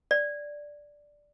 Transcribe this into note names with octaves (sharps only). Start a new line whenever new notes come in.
D5